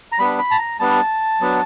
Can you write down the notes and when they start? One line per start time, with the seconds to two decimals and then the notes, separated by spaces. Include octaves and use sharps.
0.12 A#5
0.19 G3 B3 D4 B5
0.38 B5
0.51 A5
0.59 A#5
0.79 G3 B3 D4 A5
1.40 F#3 B3 D4